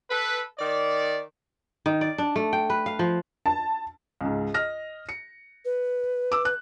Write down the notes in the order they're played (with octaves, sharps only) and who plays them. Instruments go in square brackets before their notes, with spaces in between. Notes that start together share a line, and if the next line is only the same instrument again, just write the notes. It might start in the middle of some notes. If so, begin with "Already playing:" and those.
[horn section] A4 B4
D#3 D5
[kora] D#3
D5
D4
A3
G5
B4
F5
F3
[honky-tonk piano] A5
[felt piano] C#2 G#2
D#5 F6 A#6
C#7
[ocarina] B4
[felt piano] D6 E6
F#6